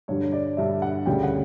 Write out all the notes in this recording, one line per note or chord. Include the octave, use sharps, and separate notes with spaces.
G2 D3 G3 C#5
D5
G2 D3 G3 E5
F#5
D2 C#3 G3 G5
F#5